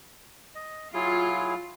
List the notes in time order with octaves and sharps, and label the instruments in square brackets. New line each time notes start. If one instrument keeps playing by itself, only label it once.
[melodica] D#5
[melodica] F#3 E4 G#4 [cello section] F4